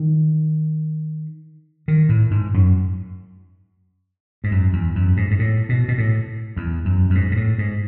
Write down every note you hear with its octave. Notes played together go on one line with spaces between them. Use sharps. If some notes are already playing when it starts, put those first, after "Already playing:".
Already playing: D#3
D#3
A2
G#2
F#2
G#2
F#2
E2
F#2
G#2
G#2
A2
B2
B2
A2
E2
F#2
F#2
G#2
G#2
A2
G#2